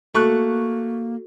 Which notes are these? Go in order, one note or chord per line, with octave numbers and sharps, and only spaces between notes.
A3 A#3 F#4 A4 C#6 F#6